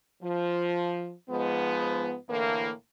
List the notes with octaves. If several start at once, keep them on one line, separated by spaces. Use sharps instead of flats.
F3
G#2 F3 G#3 B3
A2 D3 E3 A#3